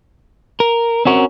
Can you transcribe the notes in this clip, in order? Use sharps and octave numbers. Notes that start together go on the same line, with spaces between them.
A#4
C4 C#4 F#4 A#4